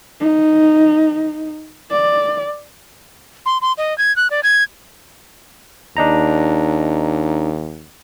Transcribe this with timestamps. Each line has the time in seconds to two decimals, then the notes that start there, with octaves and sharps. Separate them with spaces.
0.20 D#4
1.91 D5
3.46 C6
3.62 C6
3.78 D#5
3.98 G#6
4.16 F#6
4.31 D5
4.43 G#6
5.97 D#2 D4 D#4 A#5